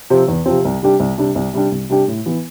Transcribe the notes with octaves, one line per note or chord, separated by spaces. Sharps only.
C3 F3 C4
E2
C3 F3 C4
C2
C3 G3 D4 G4
C2
C3 G3 D4 G4
C2
C3 G3 D4 G4
C2
C3 G3 D4 G4
A2
E3 B3